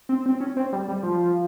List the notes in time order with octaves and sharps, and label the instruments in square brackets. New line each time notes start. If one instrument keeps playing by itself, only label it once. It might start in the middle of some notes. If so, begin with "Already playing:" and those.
[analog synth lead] C4
C4
C#4
C4
G3
G3
F3